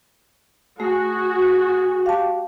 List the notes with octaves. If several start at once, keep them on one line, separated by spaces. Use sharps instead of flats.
A3 F#4 G#4
G4 F5 A5